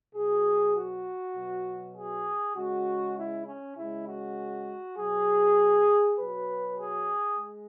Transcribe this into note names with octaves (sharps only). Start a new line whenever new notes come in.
B2 F#3 G#4
F#4
B2 F#3
G#4
C#3 G#3 F#4
E4
C#4
C#3 G#3 E4
F#4
B2 F#3 G#4
B2 F#3 B4
G#4
G#3